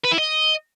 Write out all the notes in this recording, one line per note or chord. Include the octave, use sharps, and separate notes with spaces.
B4
E4
D#5